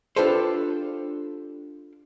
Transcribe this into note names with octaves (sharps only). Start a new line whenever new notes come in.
D4 F4 G4 A4 B4 C5